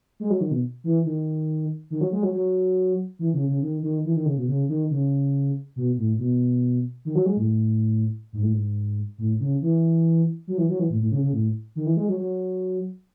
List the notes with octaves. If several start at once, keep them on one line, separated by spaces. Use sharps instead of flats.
G#3
F#3
D#3
B2
E3
D#3
D#3
F#3
G#3
F#3
F#3
E3
C#3
C#3
D#3
D#3
E3
D#3
C#3
B2
C#3
D#3
C#3
B2
A2
B2
D#3
F#3
G#3
A2
G#2
A2
G#2
A2
C#3
E3
F#3
E3
F#3
E3
A2
A2
C#3
C#3
A2
D#3
E3
G#3
F#3
F#3